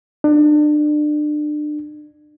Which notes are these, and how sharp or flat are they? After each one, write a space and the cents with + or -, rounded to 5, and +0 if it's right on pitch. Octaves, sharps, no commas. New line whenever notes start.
D4 +30